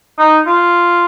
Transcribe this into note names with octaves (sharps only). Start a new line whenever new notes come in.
D#4
F4